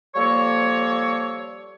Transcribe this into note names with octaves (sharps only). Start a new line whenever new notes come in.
F3 G3 A#3 A4 C#5